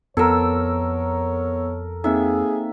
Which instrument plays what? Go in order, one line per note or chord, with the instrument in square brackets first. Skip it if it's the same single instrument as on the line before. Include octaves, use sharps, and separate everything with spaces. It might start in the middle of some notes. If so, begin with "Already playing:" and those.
[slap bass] F2 [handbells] B3 E6 [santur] A4 A#4 [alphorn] C#5
[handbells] A#3 C4 D#4 [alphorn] G#4 [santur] E5